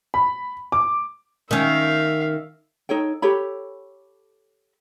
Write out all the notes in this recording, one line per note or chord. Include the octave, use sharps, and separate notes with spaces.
B5
D6
D#3 C#4 E5 F5
D#4 A4 C#5 G5
G4 A4 C#5 B5